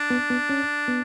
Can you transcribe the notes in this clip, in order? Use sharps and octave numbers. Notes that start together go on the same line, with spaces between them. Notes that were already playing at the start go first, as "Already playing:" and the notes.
Already playing: D4
B3
B3
C#4
B3